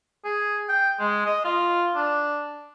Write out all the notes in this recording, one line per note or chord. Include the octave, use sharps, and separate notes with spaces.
G#4
G5
G#3
D#5
F4
D4